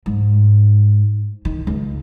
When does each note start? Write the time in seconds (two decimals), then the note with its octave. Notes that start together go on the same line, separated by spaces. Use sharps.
0.06 G#2
1.45 D#3
1.67 C#2